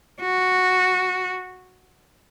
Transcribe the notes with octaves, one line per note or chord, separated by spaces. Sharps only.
F#4